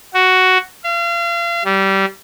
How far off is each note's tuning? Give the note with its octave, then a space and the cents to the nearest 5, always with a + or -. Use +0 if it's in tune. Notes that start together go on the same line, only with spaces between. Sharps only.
F#4 +5
F5 -35
G3 -20